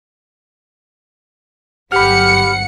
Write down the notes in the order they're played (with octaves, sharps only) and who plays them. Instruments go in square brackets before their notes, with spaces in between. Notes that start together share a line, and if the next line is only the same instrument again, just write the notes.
[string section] G1 F#3 C#7 [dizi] G4 [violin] F#5 [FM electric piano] B5 F6